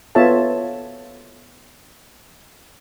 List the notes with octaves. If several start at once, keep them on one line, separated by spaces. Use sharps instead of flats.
B3 F4 A4 C#5 E5 A5